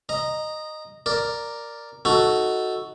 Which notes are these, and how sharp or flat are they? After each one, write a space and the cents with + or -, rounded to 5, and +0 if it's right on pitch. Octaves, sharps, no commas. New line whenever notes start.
D#5 -10 A#5 +0
A#4 +0 D5 +0
D#4 +15 F#4 +0 A4 +0